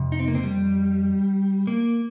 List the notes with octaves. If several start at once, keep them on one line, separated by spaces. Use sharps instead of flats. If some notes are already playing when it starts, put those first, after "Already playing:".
Already playing: F2 C3
D#4
C4
A#3
C3 C4
G3
A#3